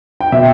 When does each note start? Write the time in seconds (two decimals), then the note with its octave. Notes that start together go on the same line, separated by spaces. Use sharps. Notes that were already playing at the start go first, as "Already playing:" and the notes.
0.21 G5
0.32 B2 E5